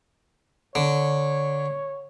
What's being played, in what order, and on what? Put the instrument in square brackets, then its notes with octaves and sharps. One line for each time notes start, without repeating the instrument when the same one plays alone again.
[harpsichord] D3 [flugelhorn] C#5